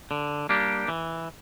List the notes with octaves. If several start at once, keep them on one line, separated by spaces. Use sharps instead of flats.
D3
G3 A#3 D4 G4
E3